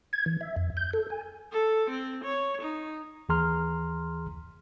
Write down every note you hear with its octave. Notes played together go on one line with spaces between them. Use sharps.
G#6
E3
E5
F2
G6
A4
G#5
A4
C4
C#5
D#4
D#2 E3 G#4 A#5 C6 F6